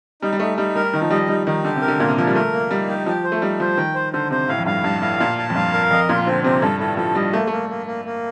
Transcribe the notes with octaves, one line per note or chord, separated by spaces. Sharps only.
G3 D#4
G3
A3 D#4
G3 D#4
G3 A#4
D#3 D#4
F3
G3 D#5
G3 D#4
D#3 D#4
D3 G4
C3
A#4
D3
A#2 A#3
C3
F3 A#4
G3
A3 A#4
A#3
G3 D#4
G4
F3 G4
C5
A3
G3 D#4
F3 C5
D#3 G5
C5
D3 C5
C3 C5
A2 F5
F2
G2 F5
G2 A5
A2 F5
A#2 A5
A5
F2
G2 F5
A#4
F2 D#5
A#2 F4
D3 C4
C3 C4
G2 A4
A2 A4
F3 A4
G3 D#5
A3 A#3
A3 A#3
A#3
A#3
A#3